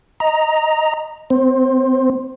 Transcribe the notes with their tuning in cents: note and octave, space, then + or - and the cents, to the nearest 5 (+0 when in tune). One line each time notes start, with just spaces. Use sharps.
D#5 +5 A#5 +0
C4 -35 C5 +15